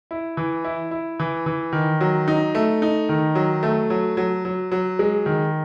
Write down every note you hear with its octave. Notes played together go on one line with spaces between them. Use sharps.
E4
E3
E4
E4
E3
E3
D#3
F#3
D#4
A3
D#4
D#3
F#3
A3
F#3
F#3
F#3
F#3
G#3
D#3